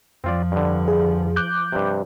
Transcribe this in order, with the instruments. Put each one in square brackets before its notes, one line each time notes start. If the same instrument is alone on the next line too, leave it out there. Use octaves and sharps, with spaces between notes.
[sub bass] F2 [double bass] F3 [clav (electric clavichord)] C4 F4 D5
[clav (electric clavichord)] G2 D3
[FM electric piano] G#4
D6 F#6 G6
[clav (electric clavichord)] G2 C3